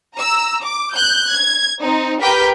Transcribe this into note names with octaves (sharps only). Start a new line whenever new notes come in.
A#5 E6
D6
F#6 G6
G#6
C4 D#4
G4 A#4 B4 G5 B6